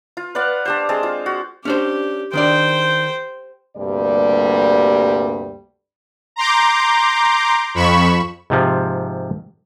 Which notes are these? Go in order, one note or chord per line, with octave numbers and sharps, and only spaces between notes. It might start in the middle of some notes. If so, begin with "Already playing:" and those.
F4
B4 D5 F5 F#5
D4 G4 C5
G#3 C4 A5 D6
F4
F#4
C#4 D4 G4 C5
D#3 D4 C5 D5 G5
D2 G2 C3 G3 A#3 D5
A#5 C6 D6 G6
F2 B5 C#6 E7
G#2 C3 F3